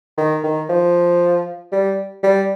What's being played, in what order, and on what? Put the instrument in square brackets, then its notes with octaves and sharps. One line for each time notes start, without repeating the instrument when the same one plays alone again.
[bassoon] D#3
D#3
F3
G3
G3